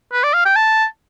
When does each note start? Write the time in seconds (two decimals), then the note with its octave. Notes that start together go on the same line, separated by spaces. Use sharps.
0.13 B4
0.23 D5
0.33 F5
0.45 G5
0.56 A5